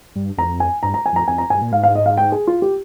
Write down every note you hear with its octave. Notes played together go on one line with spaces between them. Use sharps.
G2
F2 A#5
G#5
G2 A#5
A#5
G#5
F2 A#5
F2 G#5
A#5
G2 G#5
A#2
G#2 F5
F5
D#5
F5
G5
G#4
F4
G4